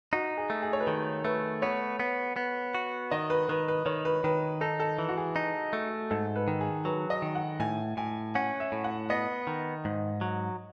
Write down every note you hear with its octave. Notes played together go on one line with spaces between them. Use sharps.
D#4 F#4
G#4
A3
G#4
C#5
B4
D#3 A4
A3 B4
B3 C#5
B3
B3
F#4
D#3 D#5
B4
D#3 B4
B4
D#3 C#5
B4
D#3 B4
D#4 A4
A4
E3
F#4
G#4
D#4
A3
G#2 A4
B4
D#3
G#4
F#3 B4
D#5
D#3
F#5
A2 G#5
A2 G#5
C#4 F#5
E5
A2
F#5
B3 D#5
D#3
G#2
F#3